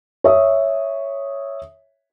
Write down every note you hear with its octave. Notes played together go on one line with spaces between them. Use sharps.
C#5 E5 D#6